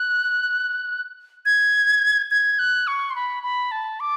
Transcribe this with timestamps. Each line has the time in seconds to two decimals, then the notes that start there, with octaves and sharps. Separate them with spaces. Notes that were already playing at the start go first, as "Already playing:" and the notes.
Already playing: F#6
1.46 G#6
2.31 G#6
2.59 F#6
2.87 C#6
3.10 C6
3.16 B5
3.43 B5
3.72 A5
4.00 D6